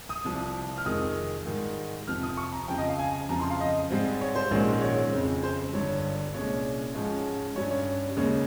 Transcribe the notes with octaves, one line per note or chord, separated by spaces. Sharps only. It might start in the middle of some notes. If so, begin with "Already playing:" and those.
D#6
C2 C3 F3
F6
F2 C3 D#3 G#3 D#6
G#2 D#3 G3
F2 C3 F3 F6
D#6
C#6
A#5
F2 C#3 F3 G5
D#5
F5
G#5
F2 C#3 F3 A#5
C6
F5
D#5
G#2 G3 C4
C#5
C5
A#1 G#2 D#3 G#3 C#4
C#5
F2 C#3 G#3 C4
C5
G1 G2 G3 C#5
C2 A#2 G#3 C#4 C#5
G#2 F3 G#3 C#4
G2 G3 C#4 C#5
C#5
D#2 C#3 G#3 C#5